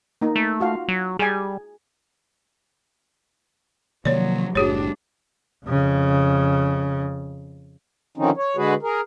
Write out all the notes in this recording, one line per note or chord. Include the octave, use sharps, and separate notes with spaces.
A#3 D#4
A3
F4 F#4 F5
F#3
G3 G#4 G#5
C3 D#3 F3 F#3 A#3 C#5 D5
F#1 A2 G3 D4 F#4 G#4 C#5
F2 C#3
D3 D#3 F3 C4 C#4 D#4
C#5
D3 G#3 F#4 G#4 B4
G#4 A#4